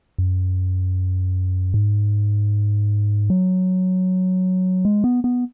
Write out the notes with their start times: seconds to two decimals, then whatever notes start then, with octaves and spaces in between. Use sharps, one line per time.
0.18 F#2
1.74 G#2
3.30 F#3
4.85 G#3
5.04 B3
5.24 B3